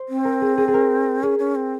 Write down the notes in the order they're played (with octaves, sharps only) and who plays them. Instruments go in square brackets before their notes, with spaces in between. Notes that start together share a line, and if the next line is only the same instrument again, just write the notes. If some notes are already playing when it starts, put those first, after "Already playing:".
Already playing: [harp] C5
[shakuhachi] C4
[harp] A#4
G#4
G#4
G#4
A#4
[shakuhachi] C#4 [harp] G#4
[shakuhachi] C#4
C4